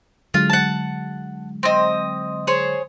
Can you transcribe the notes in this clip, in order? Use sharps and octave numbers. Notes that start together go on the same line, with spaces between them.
D3 F#3 G#3 F4
F#5 A5
C4 D#5
G#4 C5 C#5